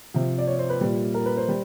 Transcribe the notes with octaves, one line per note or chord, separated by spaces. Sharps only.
C3 F3
D5
C#5
C5
B4
A#2 G3
A#4
B4
C5
G3